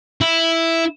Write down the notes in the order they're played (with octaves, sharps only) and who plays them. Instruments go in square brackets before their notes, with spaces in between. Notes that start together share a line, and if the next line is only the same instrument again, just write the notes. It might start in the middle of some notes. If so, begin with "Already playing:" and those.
[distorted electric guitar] E4